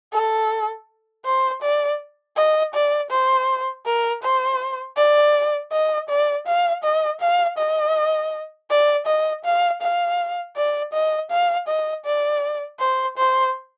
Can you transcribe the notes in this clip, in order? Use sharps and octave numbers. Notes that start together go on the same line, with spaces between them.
A4
C5
D5
D#5
D5
C5
A#4
C5
D5
D#5
D5
F5
D#5
F5
D#5
D5
D#5
F5
F5
D5
D#5
F5
D#5
D5
C5
C5